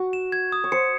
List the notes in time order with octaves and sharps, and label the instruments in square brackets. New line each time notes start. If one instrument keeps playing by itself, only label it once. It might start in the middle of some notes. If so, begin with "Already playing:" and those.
Already playing: [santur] F#4
[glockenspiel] E7
G#6
D#6
[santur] C#5
[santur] C5 [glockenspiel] C#7